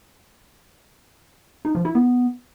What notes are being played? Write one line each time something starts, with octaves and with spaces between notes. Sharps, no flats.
D#4
F3
E4
B3